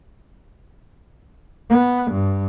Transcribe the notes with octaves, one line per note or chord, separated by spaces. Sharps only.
B3
G2